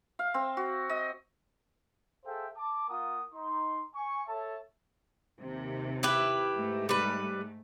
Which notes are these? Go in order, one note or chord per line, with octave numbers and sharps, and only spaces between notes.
F5
C4
F#4
D#5
G#4 A4 C5 E5 F5 G5
A5 D6
A#3 F4 A#4 F#5 D#6
D#4 C6
G#5 C#6
A4 C#5 E5 A5
D#2 C3
E4 G4 B4
G#2 A3
G3 B4